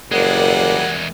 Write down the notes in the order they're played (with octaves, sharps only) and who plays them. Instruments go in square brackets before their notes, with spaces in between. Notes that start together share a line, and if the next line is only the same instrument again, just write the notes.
[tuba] F#1 [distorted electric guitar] E2 G#3 [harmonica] G3 F#5 [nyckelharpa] A#4 D5